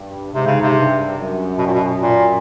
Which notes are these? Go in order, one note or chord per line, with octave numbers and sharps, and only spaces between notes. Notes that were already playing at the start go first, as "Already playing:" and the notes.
Already playing: G2
G#2 C3
C#3
C3
G2
F#2
B2
A#2
B2
F#2 A#2